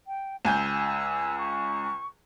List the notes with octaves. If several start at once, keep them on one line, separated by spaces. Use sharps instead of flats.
G5
C#2 G#5 E6 G6
C#6